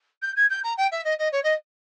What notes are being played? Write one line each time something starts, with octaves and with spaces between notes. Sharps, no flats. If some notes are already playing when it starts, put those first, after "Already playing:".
G6
G#6
G6
A#5
G5
E5
D#5
D#5
C#5
D#5